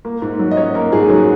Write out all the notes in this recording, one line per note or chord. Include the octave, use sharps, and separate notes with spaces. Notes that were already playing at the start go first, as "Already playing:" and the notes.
A#3
G#2
F#3
D#5
C#4 C#5
A#3 A#4
G#2 G#4
F#3 F#4